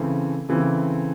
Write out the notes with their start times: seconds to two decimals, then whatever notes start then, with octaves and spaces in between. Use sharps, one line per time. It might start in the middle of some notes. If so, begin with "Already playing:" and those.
Already playing: C#3 E3 A3 C4
0.49 C#3 E3 A3 C4